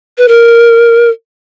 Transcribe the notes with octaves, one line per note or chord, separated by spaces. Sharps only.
B4
A#4